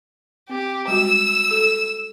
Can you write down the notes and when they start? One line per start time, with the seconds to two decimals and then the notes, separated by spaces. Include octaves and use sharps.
0.50 C4 G4
0.88 G3 G#3 F#4 E6
1.51 A4